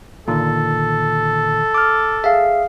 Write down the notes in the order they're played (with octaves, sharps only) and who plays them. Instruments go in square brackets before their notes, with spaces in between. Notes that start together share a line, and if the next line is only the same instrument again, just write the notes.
[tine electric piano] A#2 D3 D#3 [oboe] A4
[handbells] D6 F6
[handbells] G#4 F5 [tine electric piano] E5